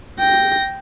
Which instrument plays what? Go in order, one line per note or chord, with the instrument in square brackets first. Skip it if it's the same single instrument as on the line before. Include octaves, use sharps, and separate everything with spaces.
[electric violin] G5 A#6